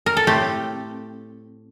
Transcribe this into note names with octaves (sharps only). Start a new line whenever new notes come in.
A#4
A4
A2 A3 C4 G4